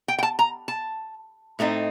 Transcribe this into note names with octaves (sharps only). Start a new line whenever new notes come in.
G5
G5
A5
A#5
A5
A2 A3 C4 D#4